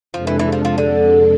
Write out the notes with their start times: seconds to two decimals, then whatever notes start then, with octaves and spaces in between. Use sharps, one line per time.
0.14 F2 C3 F3 G#3 D4 A4
0.27 E3
0.39 E3
0.52 F3
0.65 F3
0.78 D3